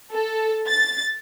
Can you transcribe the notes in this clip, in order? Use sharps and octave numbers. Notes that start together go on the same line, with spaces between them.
A4
A6